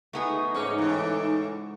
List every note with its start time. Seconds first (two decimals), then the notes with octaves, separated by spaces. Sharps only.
0.13 A3 B3 D#4 F#4 G#4
0.54 G#2 C#3 C#4 D6
0.78 A2 E3